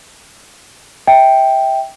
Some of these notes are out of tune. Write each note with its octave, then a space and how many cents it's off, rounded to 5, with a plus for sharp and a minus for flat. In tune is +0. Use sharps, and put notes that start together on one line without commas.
E5 -25 G5 +0